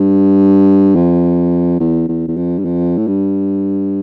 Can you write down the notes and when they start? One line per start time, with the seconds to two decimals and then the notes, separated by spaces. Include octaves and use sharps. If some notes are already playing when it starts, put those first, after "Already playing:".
Already playing: G2
0.95 F2
1.80 E2
2.08 E2
2.28 E2
2.37 F2
2.59 G2
2.65 F2
2.97 A2
3.07 G2